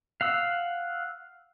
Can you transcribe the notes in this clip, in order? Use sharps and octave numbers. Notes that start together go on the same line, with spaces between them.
F5 F#5 E6